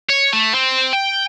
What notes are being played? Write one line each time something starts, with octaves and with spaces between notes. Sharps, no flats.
C#5
A3
C4
G5